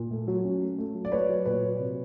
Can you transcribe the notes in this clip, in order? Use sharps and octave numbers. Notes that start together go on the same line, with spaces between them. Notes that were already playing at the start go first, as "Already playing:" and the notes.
Already playing: A#2
A3
F#3
C#4
A3
A3
F#3
D5
A3 B4 C#5
F#3
A#2 B4 C#5
F#3
C3